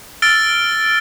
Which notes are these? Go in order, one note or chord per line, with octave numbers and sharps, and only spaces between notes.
E6 F6 A6 D7 G7